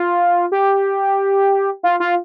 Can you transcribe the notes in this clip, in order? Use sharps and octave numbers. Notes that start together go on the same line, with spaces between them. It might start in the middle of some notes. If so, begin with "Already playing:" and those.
Already playing: F4
G4
F4
F4